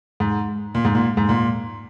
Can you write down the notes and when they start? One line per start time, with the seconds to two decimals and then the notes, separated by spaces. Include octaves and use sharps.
0.20 G#2
0.75 A#2
0.85 G#2
0.95 A#2
1.17 G#2
1.29 A#2